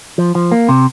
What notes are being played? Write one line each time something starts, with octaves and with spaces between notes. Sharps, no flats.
F3
F3
A#3
C3